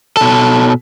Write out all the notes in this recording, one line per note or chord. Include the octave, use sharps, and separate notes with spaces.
B2 A4